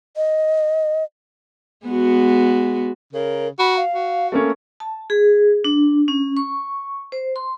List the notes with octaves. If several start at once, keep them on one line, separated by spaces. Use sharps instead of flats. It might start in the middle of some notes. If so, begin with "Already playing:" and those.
D#5
G#3 B3 F#4
C#3 A#4
F#4 B5
F5
F#4
A3 A#3 C#4
A5
G#4
D4
C#4
C#6
C5
C6